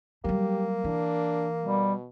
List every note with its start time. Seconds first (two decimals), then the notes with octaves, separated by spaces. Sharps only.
0.25 F#3 G3 A#3 G4
0.84 E3 D4
1.65 B2 G3